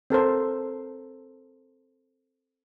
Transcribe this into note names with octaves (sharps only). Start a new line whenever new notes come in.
C4 A4 A#4 C5